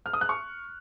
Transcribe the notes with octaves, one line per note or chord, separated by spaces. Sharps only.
F6
D#6
F#6
C#6